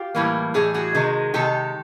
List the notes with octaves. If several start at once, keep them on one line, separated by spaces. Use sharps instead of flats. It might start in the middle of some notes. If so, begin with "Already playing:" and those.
Already playing: F4 G4
A2 E3 G3 A#3
A2 E3 G3 G#4
F#4 G#4
C3 D#3 G#3
C3 D#3 G#3 G4 A4